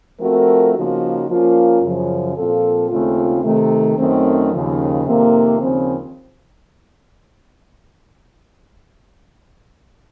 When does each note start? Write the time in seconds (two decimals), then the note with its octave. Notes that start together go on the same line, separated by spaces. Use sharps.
0.20 F3 A3 C4 F#4 A#4
0.74 C#3 F3 A#3 D#4 F#4
1.29 F3 A#3 C#4 F4 A#4
1.82 F#2 C#3 F3
2.36 A#2 F3 C4 F4 A4
2.89 D#2 C#3 A3 C4 F4
3.44 C3 D#3 A3
3.98 F#2 D#3 A3 C4
4.51 D#2 C#3 F3
5.06 F2 C3 D#3 A#3
5.60 D#2 C#3 F3 C4